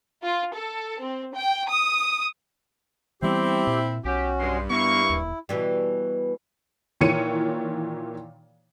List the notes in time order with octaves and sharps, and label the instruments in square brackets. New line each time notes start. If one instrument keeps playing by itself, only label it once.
[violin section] F4
A4
C4
G5
D#6
[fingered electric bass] E3 G3 B3 [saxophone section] C4 E4 [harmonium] G4
[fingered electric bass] A#2
[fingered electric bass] B1 [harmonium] C#4 F#4 [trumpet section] G4
[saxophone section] G2 [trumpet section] G#3 C6
[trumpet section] A#3 C#6 [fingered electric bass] B3 [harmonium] E4
[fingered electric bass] D1 D#2
[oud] B2 E3 G3
[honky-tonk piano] A#2 D#3 E3 C#5 C#7 D#7